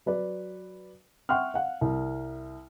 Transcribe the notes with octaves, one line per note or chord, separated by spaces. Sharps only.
F#3 B4 D5
E5 F#5 G5 C6 C#6 F6
F5 F#5
C2